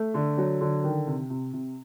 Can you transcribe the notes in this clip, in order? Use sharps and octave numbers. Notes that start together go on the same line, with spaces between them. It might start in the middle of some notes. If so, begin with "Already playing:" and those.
Already playing: A3
D3
F#3
D3
D#3
C3
C3
C3